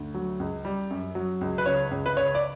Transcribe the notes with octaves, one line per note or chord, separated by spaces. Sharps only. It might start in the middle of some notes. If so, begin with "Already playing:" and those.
Already playing: D2
F#3
C#2
G3
F#2
F#3
C#2
B4
C#3 C#5
C#2
B4
C#3 C#5
D5